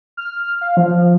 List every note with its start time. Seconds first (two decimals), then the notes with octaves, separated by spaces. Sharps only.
0.17 F6
0.61 F5
0.77 F3